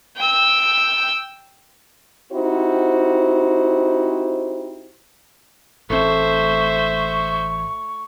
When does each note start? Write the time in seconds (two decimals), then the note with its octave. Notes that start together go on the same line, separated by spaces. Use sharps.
0.17 G5 E6
2.33 C4 D#4 E4 F#4 G4 C5
5.90 A1 A3 C4 E4 C5 E5 C6 C#6